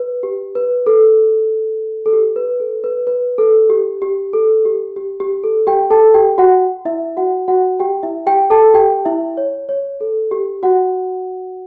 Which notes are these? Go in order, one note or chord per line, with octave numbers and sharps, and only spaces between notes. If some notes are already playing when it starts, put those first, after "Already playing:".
Already playing: B4
G4
B4
A4
A4
G4
B4
A4
B4
B4
A4
G4
G4
A4
G4
G4
G4
A4
G4 G5
A4 A5
G4 G5
F#4 F#5
E4 E5
F#4 F#5
F#4 F#5
G4 G5
E4 E5
G4 G5
A4 A5
G4 G5
E4 E5
C#5
C#5
A4
G4
F#4 F#5